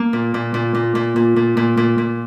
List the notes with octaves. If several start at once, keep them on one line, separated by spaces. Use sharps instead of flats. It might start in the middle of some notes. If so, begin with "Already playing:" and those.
Already playing: A#3
A#2
A#2
A#2
A#2
A#2
A#2
A#2
A#2
A#2
A#2